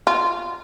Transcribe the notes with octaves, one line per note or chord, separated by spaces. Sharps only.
F4